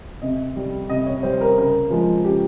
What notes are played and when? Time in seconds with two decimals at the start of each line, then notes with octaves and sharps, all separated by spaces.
0.22 C3 D#5
0.56 G3
0.89 C3 D#5
1.06 C#5
1.23 G3 C5
1.41 A#4
1.58 C#3 A#4
1.90 F3 G#3
2.24 C#3 G4